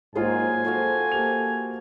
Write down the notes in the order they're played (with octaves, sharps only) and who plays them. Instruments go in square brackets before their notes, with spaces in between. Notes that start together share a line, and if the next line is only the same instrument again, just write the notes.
[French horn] G#2 [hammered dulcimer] D#3 F#3 C5 [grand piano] A#3 F4 G#4 [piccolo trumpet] G#5
[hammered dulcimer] F3 F#4 F5 [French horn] A4
[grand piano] A#3 G4 F7